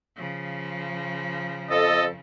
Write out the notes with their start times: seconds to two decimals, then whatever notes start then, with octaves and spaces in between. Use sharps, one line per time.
0.17 C#3 F3
1.70 F2 A4 D#5